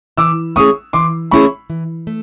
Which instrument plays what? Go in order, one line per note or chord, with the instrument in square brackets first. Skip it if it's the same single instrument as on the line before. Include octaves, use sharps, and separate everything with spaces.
[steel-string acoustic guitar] E3 [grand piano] D6 E6
[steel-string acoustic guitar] A3 C#4 E4 G#4 [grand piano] C#6 D#6
[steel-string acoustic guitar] E3 [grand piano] C6 D6
[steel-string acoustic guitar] A3 C#4 E4 G#4 [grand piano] B5 C#6
[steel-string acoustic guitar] E3
A3